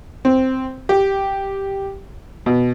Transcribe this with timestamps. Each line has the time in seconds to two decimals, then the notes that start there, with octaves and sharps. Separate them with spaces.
0.25 C4
0.89 G4
2.46 B2